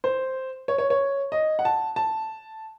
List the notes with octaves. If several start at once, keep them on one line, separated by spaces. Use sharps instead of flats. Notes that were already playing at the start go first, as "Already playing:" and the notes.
C5
C#5
C#5
C#5
D#5
F#5
A5
A5